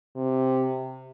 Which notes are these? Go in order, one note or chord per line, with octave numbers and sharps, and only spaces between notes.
C3